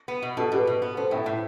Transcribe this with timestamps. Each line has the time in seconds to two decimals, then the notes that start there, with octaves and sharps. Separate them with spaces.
0.08 B3
0.22 B2
0.37 B2 F#4 A4
0.52 B2 G4 B4
0.67 B2
0.82 B3
0.97 B3 A4 C5
1.11 A2 E5 G5
1.26 A2